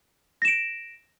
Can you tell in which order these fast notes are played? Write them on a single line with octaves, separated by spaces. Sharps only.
A#6 E7 D7